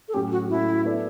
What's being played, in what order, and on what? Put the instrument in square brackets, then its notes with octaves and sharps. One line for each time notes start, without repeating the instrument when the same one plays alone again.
[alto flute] A4
[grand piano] A2 F#3 C#4 [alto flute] G4
[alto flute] F#4
[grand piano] A2 F#3 C#4 [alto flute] E4
[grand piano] B3 D4 A4 D5